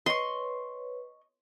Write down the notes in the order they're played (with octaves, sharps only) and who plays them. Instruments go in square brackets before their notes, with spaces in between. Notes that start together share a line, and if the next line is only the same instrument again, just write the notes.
[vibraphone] B4 C#5 [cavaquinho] D#5 C#6 [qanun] C6